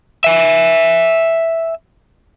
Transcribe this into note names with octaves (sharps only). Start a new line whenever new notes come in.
E5 G#5